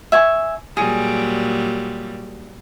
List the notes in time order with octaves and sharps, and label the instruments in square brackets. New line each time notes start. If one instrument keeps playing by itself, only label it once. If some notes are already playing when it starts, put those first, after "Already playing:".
[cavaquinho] E5 G#5 C#6
[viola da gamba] A#2 F#3 G3 [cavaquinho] G#4